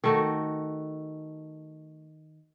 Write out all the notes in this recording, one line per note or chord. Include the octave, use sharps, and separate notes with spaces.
D#3 A3 F#4